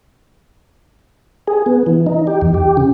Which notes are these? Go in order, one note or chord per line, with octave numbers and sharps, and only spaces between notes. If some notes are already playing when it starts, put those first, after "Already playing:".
G#4
B3
E3
D#4
G4
E2
G4
C#3